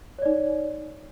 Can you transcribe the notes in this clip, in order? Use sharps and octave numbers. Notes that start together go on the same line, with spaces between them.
D#4 C#5 D5